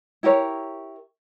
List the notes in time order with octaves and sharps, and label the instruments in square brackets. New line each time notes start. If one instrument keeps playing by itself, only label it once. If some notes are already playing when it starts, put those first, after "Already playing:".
[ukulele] E4 G4 A#4 C#5